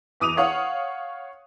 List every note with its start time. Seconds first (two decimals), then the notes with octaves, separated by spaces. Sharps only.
0.20 E2 D6 D#6 D#7 F7
0.37 C#5 F5 F#5